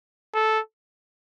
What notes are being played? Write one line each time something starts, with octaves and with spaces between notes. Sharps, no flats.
A4